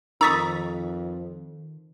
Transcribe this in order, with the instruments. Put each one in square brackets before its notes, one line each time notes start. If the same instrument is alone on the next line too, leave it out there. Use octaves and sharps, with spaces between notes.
[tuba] F2 [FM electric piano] D#3 [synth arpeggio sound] A#5 C#6 D#6 [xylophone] E6 A6 B6